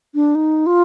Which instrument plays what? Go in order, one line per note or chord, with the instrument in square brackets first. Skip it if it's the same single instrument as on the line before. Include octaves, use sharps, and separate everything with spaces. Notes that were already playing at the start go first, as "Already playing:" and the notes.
[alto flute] D4
D#4
F4